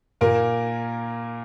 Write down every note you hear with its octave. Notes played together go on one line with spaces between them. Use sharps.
A#2 A#3 A#4